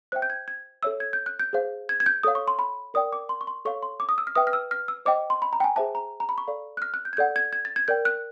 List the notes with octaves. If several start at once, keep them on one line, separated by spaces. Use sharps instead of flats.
C5 E5 G5 F#6
G6
G#6
G#6
A4 C#5 E5 E6
G#6
G6
F#6
G6
G#4 C5 F5
G#6
G#6
G6
A4 C#5 F5 D#6
C#6
C6
B5
A#4 D5 G5 D#6
D6
C6
C#6
C6
A4 C#5 F5 C#6
C6
D6
D#6
E6
F6
B4 E5 G5 D#6
F6
E6
F6
E6
C5 D#5 G5 D6
C6
B5
A#5
G5
G#5
G#4 C5 E5 A5
A#5
A#5
B5
C#6
A4 D5 F5
F#6
F6
F#6
G6
G#6
A4 D5 F#5 G6
G#6
G#6
A6
G#6
A#4 D5 G5 G6
F#6